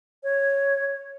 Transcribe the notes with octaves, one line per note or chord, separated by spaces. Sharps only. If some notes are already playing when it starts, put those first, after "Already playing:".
C#5